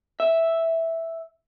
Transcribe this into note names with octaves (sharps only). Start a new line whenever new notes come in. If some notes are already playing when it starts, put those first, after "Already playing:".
E5